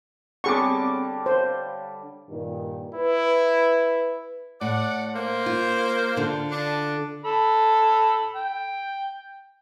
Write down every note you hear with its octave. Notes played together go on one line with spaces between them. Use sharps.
D3 G3 B3 C4 G#4 C#5 C#6 D6
C5 C#5 F5
G2 A#2 D#3
E4 B4
A2 D5 F#5
A#3 C5
F4
D3 F4
D4
A4 B5
G5